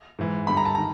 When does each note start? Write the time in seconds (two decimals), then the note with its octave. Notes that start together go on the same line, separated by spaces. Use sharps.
0.19 G#2 E3
0.47 G2 D3 B5
0.57 A#5
0.65 A5
0.75 D#3 A#5